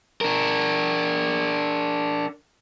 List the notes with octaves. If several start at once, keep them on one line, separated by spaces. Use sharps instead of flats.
D4 A#4